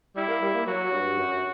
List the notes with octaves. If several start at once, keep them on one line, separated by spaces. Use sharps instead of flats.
G3 E4
A#3
G3
A#3
F#3 F#4
G2
F#2